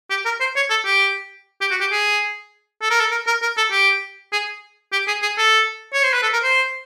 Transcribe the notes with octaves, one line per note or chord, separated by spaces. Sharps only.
G4
A#4
C5
C#5
A4
G4
G4
F#4
G4
G#4
A4
A#4
A4
A#4
A#4
A#4
A4
G4
G#4
G4
G#4
G#4
A4
C#5
C5
B4
A4
A#4
C5